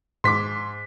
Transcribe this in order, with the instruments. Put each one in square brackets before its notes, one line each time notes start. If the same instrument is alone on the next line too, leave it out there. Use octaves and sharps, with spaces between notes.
[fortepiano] G#2 D6 [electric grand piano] C6 B6